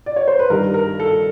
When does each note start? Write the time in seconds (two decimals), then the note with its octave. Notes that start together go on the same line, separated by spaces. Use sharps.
0.06 D5
0.16 C#5
0.28 C5
0.39 B4
0.50 G2 D#3 G3 A#4
0.74 A#4
1.00 A4